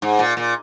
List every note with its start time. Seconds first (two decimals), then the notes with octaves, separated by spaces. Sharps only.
0.02 G#2
0.19 A#2
0.37 A#2